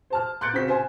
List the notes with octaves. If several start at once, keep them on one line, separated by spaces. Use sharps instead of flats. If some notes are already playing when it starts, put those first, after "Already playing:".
C5 A5 F6
C6 F#6 G6 A6 C#7 D7
C#3 C4 F#4 B6
C5 G#5 C6